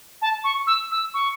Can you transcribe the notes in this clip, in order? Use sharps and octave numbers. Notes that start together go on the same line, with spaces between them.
A5
C#6
E6
E6
C#6